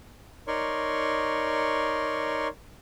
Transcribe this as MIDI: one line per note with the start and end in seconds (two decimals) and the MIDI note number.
0.47 2.48 63
0.47 2.48 70
0.47 2.48 73
0.47 2.48 74
0.47 2.48 84
0.47 2.48 85